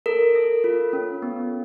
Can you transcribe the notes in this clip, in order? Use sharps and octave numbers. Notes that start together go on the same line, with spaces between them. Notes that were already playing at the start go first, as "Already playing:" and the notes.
A4 A#4
A4
F4
C#4
B3